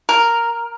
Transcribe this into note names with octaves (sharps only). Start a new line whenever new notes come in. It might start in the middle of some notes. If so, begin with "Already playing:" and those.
A#4